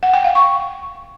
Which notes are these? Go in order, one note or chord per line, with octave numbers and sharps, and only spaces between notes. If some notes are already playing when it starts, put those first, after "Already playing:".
F#5
G5
F5
C#6